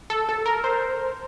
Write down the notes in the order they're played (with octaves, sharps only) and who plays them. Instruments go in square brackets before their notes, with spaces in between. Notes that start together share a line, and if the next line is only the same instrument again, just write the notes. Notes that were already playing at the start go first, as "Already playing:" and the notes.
[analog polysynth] A4
A4
A#4
C5